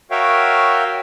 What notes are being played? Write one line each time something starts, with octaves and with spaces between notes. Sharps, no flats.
F#4 A#4 C#5 E5 F5 G5